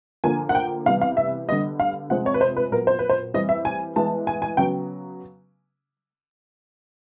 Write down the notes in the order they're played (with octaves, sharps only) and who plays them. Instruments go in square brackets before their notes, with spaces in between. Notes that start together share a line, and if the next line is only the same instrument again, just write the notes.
[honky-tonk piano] D3 F3 A#3 G#5
F#5
G5
C3 E3 G3 B3 F5
F5
E5
D3 G3 B3 D#5
F5
C3 F3 G#3 C4 F#5
C#5
B4
C5
B4
A#2 F#3 B3 A#4
C5
B4
C5
E3 G3 C4 D#5
E5
G#5
E3 G#3 B3 A5
G#5
G#5
C#3 F#3 B3 G5